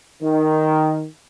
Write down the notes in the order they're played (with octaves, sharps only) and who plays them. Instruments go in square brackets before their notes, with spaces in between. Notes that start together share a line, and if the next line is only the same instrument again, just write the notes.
[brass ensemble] D#3